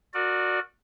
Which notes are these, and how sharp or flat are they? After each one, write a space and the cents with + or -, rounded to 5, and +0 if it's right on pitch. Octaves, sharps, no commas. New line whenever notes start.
F#4 -15 A#4 -15 D5 +15